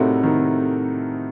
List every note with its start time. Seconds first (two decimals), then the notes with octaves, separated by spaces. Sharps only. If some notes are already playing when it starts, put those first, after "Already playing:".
Already playing: A2 C3 A3 C4 D#4 F#4 A#4
0.23 C3 D#3